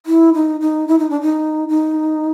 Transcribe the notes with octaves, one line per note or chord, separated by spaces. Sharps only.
E4
D#4
D#4
E4
D#4
D4
D#4
D#4